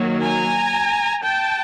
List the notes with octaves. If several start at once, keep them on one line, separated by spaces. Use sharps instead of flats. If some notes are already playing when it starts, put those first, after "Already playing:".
Already playing: D#3 F#3 A#3
G#5 A#5
G5 A5